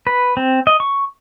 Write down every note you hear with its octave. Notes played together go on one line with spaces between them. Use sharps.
B4
C4
D#5
C#6